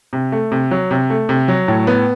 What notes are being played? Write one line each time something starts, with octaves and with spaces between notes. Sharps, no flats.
C3
A3
C3
F#3
C3
A3
C3
F#3
A2
B3